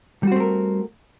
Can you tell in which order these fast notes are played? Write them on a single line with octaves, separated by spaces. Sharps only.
G3 F#4 C4 A3 A#4